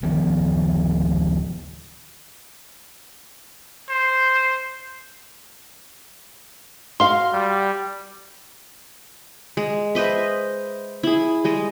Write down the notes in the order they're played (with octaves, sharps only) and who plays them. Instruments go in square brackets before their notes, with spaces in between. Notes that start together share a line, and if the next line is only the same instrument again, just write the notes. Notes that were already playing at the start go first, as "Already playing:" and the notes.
[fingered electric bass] D1 D#3 F3 B3
[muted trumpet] C5
[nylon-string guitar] F#4 F5 [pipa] C6
[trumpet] G3
[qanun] G#3
B4 C5 D#5 E5
E4 G#4
G3 G#3 D#5